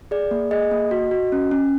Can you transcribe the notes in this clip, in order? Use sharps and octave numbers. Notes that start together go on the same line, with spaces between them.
G#4 D5
A#3
G#4 D#5
A#3
F#4
F#4
C#4
C#4